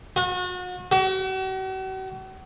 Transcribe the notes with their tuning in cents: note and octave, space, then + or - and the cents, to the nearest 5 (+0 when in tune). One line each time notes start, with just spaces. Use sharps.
F#4 -35
F#4 +45